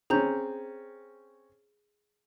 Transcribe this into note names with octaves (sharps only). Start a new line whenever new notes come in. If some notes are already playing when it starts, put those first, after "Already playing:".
C4 C#4 G#4 A#5 G6